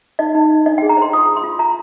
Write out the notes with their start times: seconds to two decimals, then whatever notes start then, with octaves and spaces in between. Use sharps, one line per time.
0.19 D#4 D#5
0.35 D#4
0.51 D#4
0.66 D4 D#5
0.78 G#4 G5
0.89 A#5
0.97 C5 C6
1.13 F4 D#6
1.29 F4
1.36 C6
1.44 F4
1.59 F4 A#5